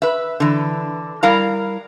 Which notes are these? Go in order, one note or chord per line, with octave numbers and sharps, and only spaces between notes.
B4 E5
D3 E3
G3 E4 A#4 F5 A#5